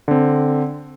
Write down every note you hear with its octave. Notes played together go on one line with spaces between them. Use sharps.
D3 C4